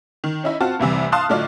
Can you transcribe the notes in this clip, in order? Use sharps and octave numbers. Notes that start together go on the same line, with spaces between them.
D#3
C#4 D#4 E4
C4 F4 F#4 A5
F1 C2 C3 E3
F5 A5 C6 D#6 F6 F#6
A2 D3 F#3 D4 D#4 F4